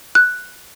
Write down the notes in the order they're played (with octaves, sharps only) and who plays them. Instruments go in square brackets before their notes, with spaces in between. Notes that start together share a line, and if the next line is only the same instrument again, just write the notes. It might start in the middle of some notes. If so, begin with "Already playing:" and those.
[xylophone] F#6